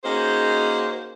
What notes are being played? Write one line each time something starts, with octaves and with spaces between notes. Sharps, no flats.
A#3 C#4 D#4 F#4 G#4 C5